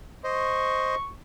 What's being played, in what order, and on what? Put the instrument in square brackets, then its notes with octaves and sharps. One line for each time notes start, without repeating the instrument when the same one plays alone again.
[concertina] C5 D#5 [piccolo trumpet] C#6